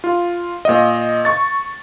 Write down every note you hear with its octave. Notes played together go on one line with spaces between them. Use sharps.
F4
A#2 D#5
C#6 A6